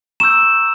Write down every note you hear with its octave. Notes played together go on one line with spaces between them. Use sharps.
A#5 C#6 E6 G6 E7